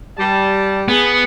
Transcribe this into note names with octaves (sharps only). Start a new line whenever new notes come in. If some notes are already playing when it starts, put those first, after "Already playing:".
G3 A5
B3 G#4